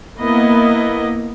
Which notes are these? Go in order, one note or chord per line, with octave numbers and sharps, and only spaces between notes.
A#3 B3 E4 D#5